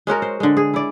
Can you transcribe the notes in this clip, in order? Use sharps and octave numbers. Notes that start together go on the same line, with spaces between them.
G#3 C#4 F#4 A#4
C5
D3 G#3
G#4
E4 D5